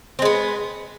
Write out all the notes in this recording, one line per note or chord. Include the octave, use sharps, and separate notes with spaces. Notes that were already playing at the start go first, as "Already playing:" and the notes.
G#3 B3 C4